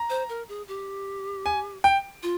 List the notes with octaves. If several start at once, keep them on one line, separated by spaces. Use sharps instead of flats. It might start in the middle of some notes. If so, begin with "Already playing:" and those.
Already playing: A#5
C5
A#4
G#4
G4
G#5
G5
F4